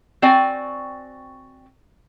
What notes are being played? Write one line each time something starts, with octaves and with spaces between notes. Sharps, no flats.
C4 F#4 D5 G5 G#5